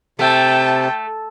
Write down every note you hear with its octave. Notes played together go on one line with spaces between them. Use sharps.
C3 A3 G5 A5